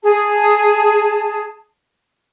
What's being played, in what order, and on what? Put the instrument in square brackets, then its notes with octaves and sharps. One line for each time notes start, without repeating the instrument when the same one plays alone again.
[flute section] G#4 A5